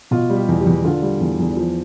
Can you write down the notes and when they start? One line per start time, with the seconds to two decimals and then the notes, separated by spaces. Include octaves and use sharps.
0.11 B2 F4
0.30 G3
0.36 G4
0.48 E2
0.60 G4
0.66 E2
0.85 D3 F4
1.02 G3
1.20 E2
1.39 E2
1.56 F3